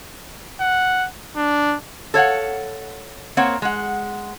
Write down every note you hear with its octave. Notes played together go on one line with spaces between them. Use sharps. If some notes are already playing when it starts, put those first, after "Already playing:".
F#5
D4
A4 C#5 F5 F#5
A#3 C4 C#5 F#5
G#3 F#5